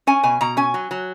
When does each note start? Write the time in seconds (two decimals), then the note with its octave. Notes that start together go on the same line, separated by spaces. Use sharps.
0.07 C#4 G#5
0.23 B2 G#5
0.41 B2 A#5
0.57 C#4 G#5
0.74 F#3
0.91 F#3